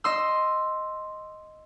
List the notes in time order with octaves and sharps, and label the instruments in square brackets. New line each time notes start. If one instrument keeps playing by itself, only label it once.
[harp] D#5 C6 E6